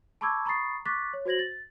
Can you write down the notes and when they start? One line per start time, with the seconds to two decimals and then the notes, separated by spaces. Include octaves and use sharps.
0.21 A5 B5 C#6 D6 E6 G#6
0.45 A#5 B5 C#6 D#6 A6 C7
0.85 C#6 D6 F#6 A6 B6
1.13 C#5
1.25 F#4 C5 G#6 A#6 F#7
1.39 A6